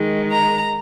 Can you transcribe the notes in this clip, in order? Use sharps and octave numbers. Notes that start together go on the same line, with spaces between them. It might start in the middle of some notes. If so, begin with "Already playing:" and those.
Already playing: D#3 G#3
A#5